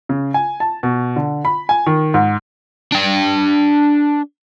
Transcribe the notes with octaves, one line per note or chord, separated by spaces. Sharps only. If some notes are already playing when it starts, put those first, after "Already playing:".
C#3
G#5
A5
B2
D3
B5
G#5
D#3
G#2
D4 G5